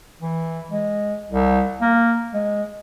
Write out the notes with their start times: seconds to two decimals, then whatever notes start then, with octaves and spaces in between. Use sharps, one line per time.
0.21 E3
0.71 G#3
1.30 C2
1.81 A#3
2.34 G#3